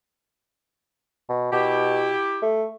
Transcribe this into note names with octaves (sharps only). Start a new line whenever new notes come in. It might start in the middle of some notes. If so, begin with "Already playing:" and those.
B2
B2 E4 G4
A3